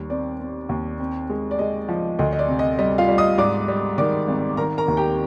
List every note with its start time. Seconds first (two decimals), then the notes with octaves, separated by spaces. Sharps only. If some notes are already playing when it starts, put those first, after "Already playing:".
Already playing: D#2 G3
0.10 C4 D5
0.40 C4
0.69 D#2
1.00 C4
1.30 G#3
1.51 D5
1.59 G#3 D#5
1.89 F3
2.19 D2 D#5
2.33 D#5
2.39 D5
2.48 C3
2.59 D#5
2.79 G3 D#5
2.98 F4 F5
3.08 G3
3.18 D#5 D#6
3.38 G#2 D5 D6
3.68 G3
3.98 D#3 D5 D6
4.28 G#1
4.57 D#3 A#4 A#5
4.78 A#4 A#5
4.88 D#2
4.97 G4 G5